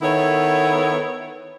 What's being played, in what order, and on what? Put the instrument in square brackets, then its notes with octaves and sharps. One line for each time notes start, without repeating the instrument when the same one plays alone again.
[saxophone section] D#3 B3 E4 A4 C#5